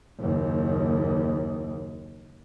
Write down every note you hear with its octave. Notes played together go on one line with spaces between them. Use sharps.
F#1 D#2